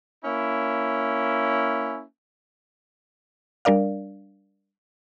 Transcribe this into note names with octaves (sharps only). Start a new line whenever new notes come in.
A#3 C#4 E4
G3 D4 A#4 D5 F5